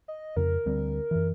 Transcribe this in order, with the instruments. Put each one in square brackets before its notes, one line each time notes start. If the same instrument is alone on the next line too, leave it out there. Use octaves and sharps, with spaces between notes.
[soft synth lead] D#5
[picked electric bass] F2 C#3 [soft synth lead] A#4
[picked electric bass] D2 G3 C4
F#2 E3